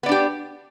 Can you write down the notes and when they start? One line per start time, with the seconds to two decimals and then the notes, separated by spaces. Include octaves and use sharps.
0.03 B3
0.06 D5
0.09 D4
0.11 G4